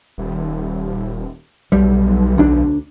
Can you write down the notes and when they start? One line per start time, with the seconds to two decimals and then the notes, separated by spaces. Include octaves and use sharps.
0.18 D#1
1.72 B1 G3
2.37 D2 D4